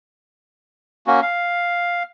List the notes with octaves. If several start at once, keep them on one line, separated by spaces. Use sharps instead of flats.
A#3 C#4 F#4
F5